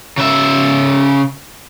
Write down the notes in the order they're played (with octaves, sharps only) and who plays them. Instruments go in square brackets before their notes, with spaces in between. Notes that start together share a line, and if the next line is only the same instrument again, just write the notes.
[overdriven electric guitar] C#3 E5